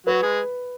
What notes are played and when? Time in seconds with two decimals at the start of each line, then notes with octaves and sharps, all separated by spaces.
0.06 F#3 F#4 B4
0.23 G#3 G#4